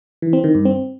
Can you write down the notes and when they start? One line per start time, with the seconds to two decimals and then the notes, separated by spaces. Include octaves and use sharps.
0.22 E3
0.33 C4
0.44 D#3
0.55 G2
0.65 C4